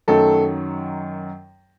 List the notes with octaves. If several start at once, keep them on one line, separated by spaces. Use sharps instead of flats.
F#2 D#3 F#3 A3 A4